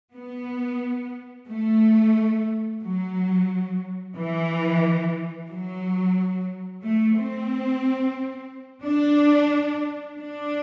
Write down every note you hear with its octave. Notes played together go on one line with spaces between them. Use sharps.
B3
A3
F#3
E3
F#3
A3
C4
D4
D4